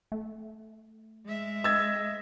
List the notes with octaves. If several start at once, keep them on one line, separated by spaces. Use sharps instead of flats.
A3
G#3 E5
D#5 E6 G#6